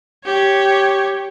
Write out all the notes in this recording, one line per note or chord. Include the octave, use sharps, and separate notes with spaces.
G4 C#5